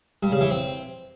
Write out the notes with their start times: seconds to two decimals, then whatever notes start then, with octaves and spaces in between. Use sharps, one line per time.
0.23 G2
0.32 C#3
0.41 E3
0.50 C4